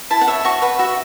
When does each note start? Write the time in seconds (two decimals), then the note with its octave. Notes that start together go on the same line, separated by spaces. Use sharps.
0.11 E4 A5
0.21 F#5
0.28 C#5 E5
0.45 F#4 C#6
0.62 B4 F#5
0.79 F#4 E5